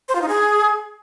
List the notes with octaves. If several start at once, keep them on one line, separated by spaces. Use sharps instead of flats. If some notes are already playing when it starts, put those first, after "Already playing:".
C5
F4
D#4
G#4